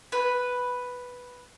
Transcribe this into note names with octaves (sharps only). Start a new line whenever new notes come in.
B4